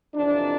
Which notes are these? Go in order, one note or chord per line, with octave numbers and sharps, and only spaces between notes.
F2 C3 E3 D4